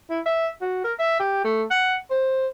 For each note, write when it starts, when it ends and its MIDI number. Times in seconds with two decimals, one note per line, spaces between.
0.10 0.20 64
0.26 0.47 76
0.61 0.84 66
0.84 0.93 70
0.99 1.15 76
1.19 1.43 67
1.44 1.63 57
1.70 1.96 78
2.10 2.47 72